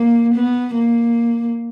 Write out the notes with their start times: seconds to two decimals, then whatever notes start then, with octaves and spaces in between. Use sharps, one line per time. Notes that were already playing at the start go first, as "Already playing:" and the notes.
Already playing: A#3
0.34 B3
0.74 A#3